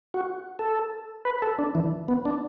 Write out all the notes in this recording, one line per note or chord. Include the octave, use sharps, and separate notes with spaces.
F#4
A4
B4
A4
D4
E3
B3
D4